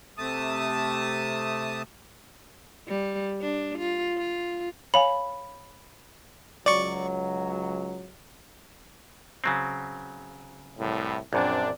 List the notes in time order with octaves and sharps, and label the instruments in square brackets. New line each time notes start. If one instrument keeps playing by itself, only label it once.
[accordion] C3 A3 A5 D#6
[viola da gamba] G3
D4
F4
F4
[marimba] C#5 F5 G#5 [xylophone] B5
[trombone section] C#2 F#3 [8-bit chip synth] D5 C#6
[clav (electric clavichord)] C#3 F#3 C4
[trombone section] C2 A2
[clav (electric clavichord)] A#1 F#2 [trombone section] C4 D4